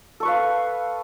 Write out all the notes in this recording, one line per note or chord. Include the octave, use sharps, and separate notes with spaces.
A4 B4 F5 C#6